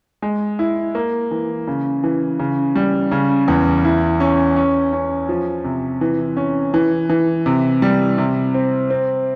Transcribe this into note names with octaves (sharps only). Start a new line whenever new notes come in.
G#3
E4
A#3
E3
C#3
E3
C#3
G3
C#3
E2
E4
C#4
C#4
C#4
F3
C3
E3
C#4
E3
E3
C3
G3
C3
C4
C4